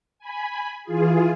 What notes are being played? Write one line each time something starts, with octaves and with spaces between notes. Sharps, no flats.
G#5 B5
E3 F4 G#4